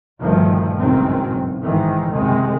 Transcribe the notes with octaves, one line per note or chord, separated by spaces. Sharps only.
G1 D2 G2 A#2 D#3 F3
F#1 B1 G#2 D#3 F#3 C4
B1
G#2 D#3 E3
F#1 C3 D#3 G#3